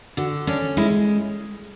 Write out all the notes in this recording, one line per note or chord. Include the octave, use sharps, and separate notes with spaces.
D3 F#4
C#4 D4
G#3 E4